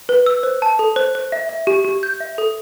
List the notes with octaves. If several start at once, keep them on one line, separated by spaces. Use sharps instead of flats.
B4
E6
C5
A5
A4
C5
C5
E5
E5
G4
G4
G6
E5
A4